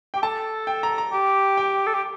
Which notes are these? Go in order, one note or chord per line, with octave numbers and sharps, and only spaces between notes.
G4 G5
A4 A5
G5
A#5
A#5
G4
G5
A4
G4